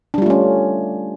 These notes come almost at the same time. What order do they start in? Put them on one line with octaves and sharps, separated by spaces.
D4 G3 F4 A3 C#4